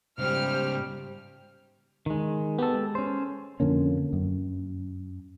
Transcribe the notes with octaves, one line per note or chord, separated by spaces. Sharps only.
G#2 C#3 G3 G4 C5 F6
D#3 G#3
B3 G4 A4
G#3
C#4 C5
F2 D3 A#3 C#4
F#2